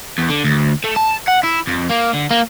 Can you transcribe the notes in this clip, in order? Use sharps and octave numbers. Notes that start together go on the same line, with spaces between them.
E2
D3
D2
A3
A5
F#5
E4
F2
A#3
D3
A#3